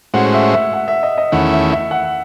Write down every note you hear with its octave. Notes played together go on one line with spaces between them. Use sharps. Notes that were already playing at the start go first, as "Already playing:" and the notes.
A2 G#3 C#4 F#4 C5 F#5
E5
E5
F#5
E5
D#5
D#5
E2 D#3 A3 C#4 E4 F#5
E5
E5
F#5